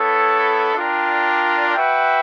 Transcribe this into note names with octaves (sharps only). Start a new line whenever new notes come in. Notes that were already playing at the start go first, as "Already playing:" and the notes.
Already playing: B3 E4 A4 C#5
D4 F4 A#4 D5 G5
F#4 B4 E5 G5